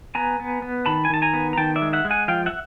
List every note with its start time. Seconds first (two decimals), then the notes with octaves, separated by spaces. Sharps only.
0.15 B3 G#5 A#5
0.40 B3
0.62 B3
0.86 D#3 A5 B5
1.05 G#5
1.10 D#3 A5
1.22 G#5 A#5
1.34 B3
1.53 A#5
1.58 D#3 G5 A5
1.76 D5 E5
1.82 G#3
1.93 E5 F#5
2.05 G#3
2.10 F#5 G#5
2.28 F3 F5 G5
2.46 E5 F#5